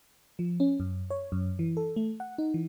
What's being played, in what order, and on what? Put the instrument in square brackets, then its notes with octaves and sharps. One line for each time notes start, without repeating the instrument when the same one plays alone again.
[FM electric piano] F3
C#4
F#2
C#5
F#2
E3
A4
A3
F#5
D#4
E3